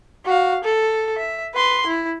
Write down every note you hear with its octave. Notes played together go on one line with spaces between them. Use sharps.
F#4 F5
A4
E5
B4 C6
E4